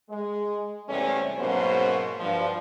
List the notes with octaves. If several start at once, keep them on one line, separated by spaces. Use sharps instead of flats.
G#3
E2 C3 G3 A3 C#4
G#2 B2 F#3 A#3 C#4 C5
G2 F3